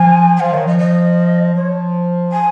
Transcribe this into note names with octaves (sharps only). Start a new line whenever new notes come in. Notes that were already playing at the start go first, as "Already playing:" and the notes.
Already playing: F3 G#5
G#5
F3 F5
D#3 C#5
F3 D#5
D#5
F3 C#5
G#5